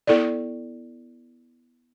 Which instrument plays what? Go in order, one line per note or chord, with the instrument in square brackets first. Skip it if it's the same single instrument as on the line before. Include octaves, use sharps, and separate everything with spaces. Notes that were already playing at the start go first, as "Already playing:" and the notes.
[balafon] B3 E4 A4 D5